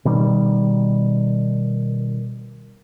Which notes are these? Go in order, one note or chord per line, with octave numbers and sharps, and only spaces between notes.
B2 D#3 G3